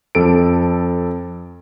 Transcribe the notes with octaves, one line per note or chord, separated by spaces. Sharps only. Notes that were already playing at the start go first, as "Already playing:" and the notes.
F2 A4 D7